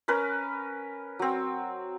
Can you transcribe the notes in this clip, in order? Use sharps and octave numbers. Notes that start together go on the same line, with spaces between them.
C#4 A#4 B4
F#3 C4